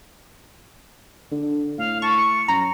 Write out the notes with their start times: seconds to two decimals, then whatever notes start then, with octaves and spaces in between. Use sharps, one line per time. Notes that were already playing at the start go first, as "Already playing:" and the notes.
1.31 D3
1.78 A2 F5
2.02 A5 C#6
2.17 C#7
2.48 F#2 A#5